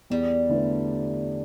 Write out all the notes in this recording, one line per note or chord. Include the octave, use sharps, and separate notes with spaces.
E2 G3
D3 A3 E4 B4